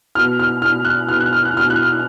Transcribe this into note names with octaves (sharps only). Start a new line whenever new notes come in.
B2 F6
F6
B2 F6
F#6
B2 F6
F#6
F6
F#6
B2 F6
F#6
F6